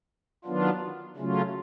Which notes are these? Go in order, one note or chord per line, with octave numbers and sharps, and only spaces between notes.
D#3 F#3 B3 D4 F4
C#3 F#3 A3 C#4 F4